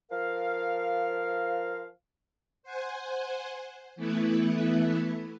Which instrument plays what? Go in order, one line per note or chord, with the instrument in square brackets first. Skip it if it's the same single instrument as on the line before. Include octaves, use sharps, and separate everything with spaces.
[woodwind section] F3 A#4 F5
[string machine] C5 F#5 G#5
E3 A3 B3 E4 B4